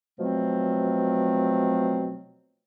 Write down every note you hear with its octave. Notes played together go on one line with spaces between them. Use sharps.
B2 F3 F#3 A3 C4